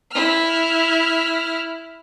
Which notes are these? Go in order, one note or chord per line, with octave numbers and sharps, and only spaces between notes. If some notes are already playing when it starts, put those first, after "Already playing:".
E4 F6